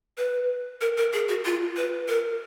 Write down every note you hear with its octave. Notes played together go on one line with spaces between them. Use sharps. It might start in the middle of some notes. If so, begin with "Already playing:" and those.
B4
A#4
A#4
G#4
F#4
F4
B4
A#4